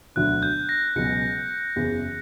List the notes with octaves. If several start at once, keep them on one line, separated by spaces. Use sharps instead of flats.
E1 D2 D3 F#3 F#6
G6
A#6
C#2 B2 F#3 C#4 C#7
F#1 E2 C#3